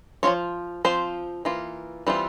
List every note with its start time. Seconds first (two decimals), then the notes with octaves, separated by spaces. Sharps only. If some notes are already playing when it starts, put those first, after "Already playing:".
0.23 F3 C4 F4 C#5
0.85 F3 C4 F4 C5
1.45 E3 A#3 F4
2.07 E3 G3 C4 F4